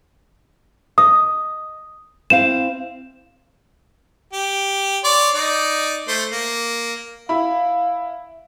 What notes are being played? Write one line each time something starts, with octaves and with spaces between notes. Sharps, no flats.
D#5 D#6
C4 E4 F5 E7
G4
C#5 D5 C6
D#4 D5
A3 C5
A#3
E4 F5 B5